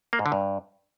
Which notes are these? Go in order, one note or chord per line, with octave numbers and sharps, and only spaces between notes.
A#3
G#2
D3
G2